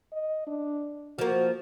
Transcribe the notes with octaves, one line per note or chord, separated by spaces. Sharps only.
D#5
D4
F3 A#3 F#4